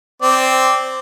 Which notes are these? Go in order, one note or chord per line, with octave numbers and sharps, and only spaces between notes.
C4 D5